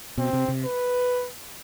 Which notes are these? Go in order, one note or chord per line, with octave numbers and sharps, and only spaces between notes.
B2 C4
C3
C3
B4